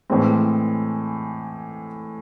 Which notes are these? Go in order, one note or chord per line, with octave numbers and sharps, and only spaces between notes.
A2 E3 G#3 C4